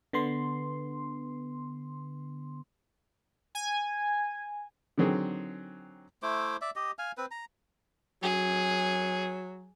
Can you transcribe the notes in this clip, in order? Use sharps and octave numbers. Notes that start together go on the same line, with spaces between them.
D3 B3 C6
G#5
D3 D#3 F#3 C4 G#4
A3 E4 C5 D6
D5 E5
G4 D#5
F5 G#5
C4 B4
A#5
F#3 G#4